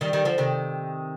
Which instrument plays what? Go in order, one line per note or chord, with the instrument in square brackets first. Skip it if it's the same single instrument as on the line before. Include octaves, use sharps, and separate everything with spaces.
[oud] D#3 G3
D#3 G3
D3 F3
C3 D#3